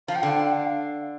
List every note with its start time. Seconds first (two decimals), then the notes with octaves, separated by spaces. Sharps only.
0.08 F3 F5
0.16 G5
0.22 D3 F5
0.30 G5
0.38 F5
0.46 G5
0.53 F5